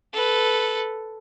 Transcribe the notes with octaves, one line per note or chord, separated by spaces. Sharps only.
A4 B4